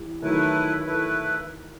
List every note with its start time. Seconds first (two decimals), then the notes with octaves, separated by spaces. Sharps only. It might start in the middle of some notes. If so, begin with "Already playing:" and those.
Already playing: E3 G3
0.22 D#3 F#3 A3 E4 B4
0.85 A3 E4 B4